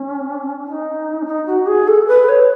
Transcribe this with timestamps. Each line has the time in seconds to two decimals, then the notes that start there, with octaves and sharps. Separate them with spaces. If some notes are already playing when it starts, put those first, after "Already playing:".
Already playing: C#4
0.65 D#4
1.22 C#4
1.26 D#4
1.46 F#4
1.67 G#4
1.88 A4
2.08 B4
2.29 C#5